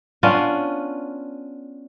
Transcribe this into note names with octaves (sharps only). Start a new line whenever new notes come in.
B3 C#4 D4 F4